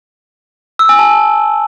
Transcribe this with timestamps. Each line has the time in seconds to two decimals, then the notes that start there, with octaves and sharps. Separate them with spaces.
0.79 E6
0.89 G#5
0.99 A5